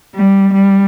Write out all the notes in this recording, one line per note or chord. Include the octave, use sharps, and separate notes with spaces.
G3
G3